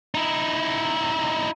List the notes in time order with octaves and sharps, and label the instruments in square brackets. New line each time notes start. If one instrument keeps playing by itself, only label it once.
[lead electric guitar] D#4 E4